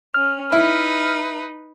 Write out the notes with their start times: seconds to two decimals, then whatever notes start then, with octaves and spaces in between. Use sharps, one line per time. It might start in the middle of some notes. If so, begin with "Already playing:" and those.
0.14 C#4 F6
0.52 D#4 E4 B4